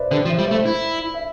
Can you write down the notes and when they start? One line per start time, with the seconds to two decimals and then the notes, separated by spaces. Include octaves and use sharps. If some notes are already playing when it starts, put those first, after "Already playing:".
Already playing: B4 C5 D5 E5
0.11 D3 G4 B4
0.25 F3
0.29 C5 E5
0.39 G3
0.47 A3 C5 E5
0.66 E4
1.14 E5